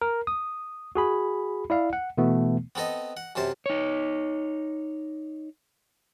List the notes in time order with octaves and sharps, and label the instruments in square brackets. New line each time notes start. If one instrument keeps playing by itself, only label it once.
[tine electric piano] A#4
D#6
F#4 G#4 B5
E4 D5 F5
F#5
B2 E3 A3 B3
[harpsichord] B3 C4 A4 D#5
F#5
F#2 C3 C5 A5
[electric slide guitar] D#4 C#5